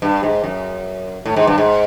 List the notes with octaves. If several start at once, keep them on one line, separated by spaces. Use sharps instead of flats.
G2
G#2
F#2
A2
G#2
G2
G#2